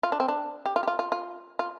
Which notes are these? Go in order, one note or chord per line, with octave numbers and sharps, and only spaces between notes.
F4
D4
C4
D4
G4
F4
G4
F4
F4
F4
F4